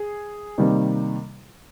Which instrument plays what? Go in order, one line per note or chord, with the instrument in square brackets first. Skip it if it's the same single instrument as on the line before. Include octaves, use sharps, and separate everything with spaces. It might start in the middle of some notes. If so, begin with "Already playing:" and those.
Already playing: [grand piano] G#4
C3 D#3 G3 A#3